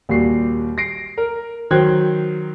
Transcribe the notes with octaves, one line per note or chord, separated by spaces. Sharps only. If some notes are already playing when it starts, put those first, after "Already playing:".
D#2 A#2 G3 F#4 C7
A#6 C7 D7
A#4
D#3 F#3 C5 G5 F#6 G#6